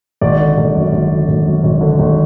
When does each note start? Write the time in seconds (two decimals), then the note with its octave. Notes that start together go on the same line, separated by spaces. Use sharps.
0.21 G#1 D5
0.40 D3
0.57 G#1
0.75 F#2
0.92 G#1
1.11 D3
1.28 G#1
1.46 F#2
1.64 G#1
1.81 D3
1.99 G#1